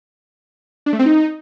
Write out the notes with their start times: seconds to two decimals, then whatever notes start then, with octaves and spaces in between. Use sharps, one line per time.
0.86 D4
0.93 A3
0.99 C4
1.06 D#4